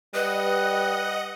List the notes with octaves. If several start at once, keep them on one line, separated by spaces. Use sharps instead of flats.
G3 B4 D#5 F#5